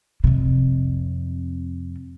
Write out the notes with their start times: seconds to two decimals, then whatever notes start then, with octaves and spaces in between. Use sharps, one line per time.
0.24 F2 C3